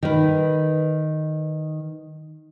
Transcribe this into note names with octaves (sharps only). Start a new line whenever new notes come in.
D#3 B4